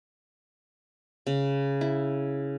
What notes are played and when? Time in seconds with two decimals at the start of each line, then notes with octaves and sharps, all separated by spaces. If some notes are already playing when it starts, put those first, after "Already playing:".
1.27 C#3
1.81 E4